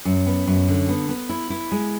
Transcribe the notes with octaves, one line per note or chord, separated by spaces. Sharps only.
F#2
B3
F#2
D3
B3
B3
E4
E4
G#3